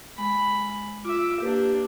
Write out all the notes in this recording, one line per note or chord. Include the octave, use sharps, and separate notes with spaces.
G#3 B5
F4 E5 D6
A#3 D4 G4 B4